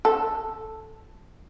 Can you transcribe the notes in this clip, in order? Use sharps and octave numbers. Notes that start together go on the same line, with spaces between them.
A4